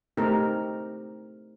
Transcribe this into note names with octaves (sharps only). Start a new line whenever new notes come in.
A3 C4 D#4 G4 A#4